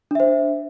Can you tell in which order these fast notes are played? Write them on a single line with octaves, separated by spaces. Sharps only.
D4 E5 C5